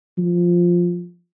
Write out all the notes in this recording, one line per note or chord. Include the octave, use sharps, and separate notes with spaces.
F3